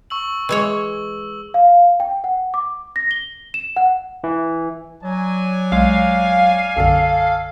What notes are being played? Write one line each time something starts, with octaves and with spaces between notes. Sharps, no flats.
C#6 E6 F#7
E3 G#3 C#5
F5
G5
F#5
D6
A#6
G7
E7
F#5
E3
F#3 D5 G#5
B1 G#3 F5
B1 F#2 D3 A4